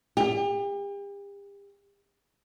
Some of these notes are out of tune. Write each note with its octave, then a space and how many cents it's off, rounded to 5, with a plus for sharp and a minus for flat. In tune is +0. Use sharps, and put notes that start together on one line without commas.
G4 +40